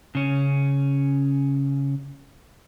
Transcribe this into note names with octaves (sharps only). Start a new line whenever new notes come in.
C#3 C#4